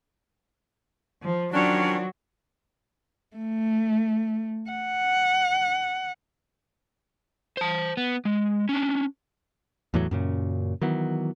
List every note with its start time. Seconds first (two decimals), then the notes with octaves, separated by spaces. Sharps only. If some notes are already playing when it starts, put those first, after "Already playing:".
1.23 F3
1.53 D#3 F3 F#3 C#4 D4
3.36 A3
4.70 F#5
7.57 C5 A5
7.97 B3
8.25 G#3
8.69 C#4 D4
9.94 E2 A2 E3 F#3
10.11 F#2 A#2 C#3
10.82 D#3 E3 F#3 B3